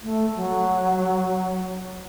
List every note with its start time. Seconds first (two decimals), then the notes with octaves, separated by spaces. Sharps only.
0.03 A3
0.36 F#3